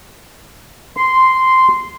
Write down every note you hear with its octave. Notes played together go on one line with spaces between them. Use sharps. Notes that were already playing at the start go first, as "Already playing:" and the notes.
C6